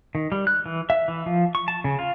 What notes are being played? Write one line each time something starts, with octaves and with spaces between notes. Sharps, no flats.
D#3
G3
F#6
E3
E5
E3
F3
C#6
A5
C#3
F4